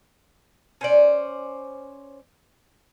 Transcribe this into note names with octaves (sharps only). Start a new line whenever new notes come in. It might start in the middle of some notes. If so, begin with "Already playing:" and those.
C#4 C5 D5